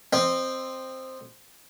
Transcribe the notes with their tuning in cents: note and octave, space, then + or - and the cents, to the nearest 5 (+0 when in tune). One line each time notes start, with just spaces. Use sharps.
C4 +0 D#5 -25